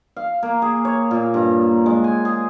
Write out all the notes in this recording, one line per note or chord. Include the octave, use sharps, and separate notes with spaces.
F5
A#3
G#4
C#5
A#2
G2
A#3
G#3
G#5
G#4